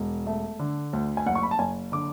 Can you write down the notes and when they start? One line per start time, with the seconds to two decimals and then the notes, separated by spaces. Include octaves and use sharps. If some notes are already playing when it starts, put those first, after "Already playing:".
Already playing: E1
0.27 A3
0.59 D3
0.93 D2
1.17 G#5
1.26 F#1 F#5
1.35 C#6
1.43 B5
1.51 A5
1.59 F#1 G#5
1.92 D3 D6